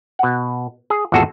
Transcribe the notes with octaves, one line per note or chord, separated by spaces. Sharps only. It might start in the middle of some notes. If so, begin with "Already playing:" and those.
B2 F#5
G#4
G#1 E2 A#2 F#4 G#4 A4